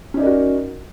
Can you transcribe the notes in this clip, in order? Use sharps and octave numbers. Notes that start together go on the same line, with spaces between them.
C#4 D#4 F#4 A#4 D5